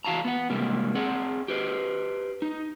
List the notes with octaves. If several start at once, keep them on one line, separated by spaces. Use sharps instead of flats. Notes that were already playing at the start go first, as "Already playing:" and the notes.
E3 F#4 F5 A5 A#5
B3 F#5
G#2 C3 G3 A#3
C4 G#4 F#5
G4 B4 C5
D#4